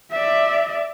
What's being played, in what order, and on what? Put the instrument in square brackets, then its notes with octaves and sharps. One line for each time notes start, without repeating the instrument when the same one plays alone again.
[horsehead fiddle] D5 E5